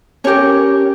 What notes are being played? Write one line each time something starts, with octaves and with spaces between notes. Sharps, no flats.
C#4 G4 A#4 C#5